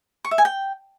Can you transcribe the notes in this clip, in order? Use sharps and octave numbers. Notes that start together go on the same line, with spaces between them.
C#6
E5
G#5
G5